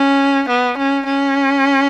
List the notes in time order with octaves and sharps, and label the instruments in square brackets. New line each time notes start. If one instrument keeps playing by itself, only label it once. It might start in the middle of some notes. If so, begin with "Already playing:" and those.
Already playing: [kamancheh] C#4
B3
C#4
C#4